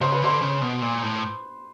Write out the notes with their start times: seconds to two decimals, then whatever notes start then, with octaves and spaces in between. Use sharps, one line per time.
0.01 C#3 C5
0.12 B4
0.22 D3 C5
0.42 C#3
0.62 B2
0.82 A#2
1.02 A2